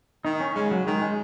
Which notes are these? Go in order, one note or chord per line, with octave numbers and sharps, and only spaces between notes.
D#3 D#4
C#4
C#3 G#3
F#3
D#3 G#3
G#3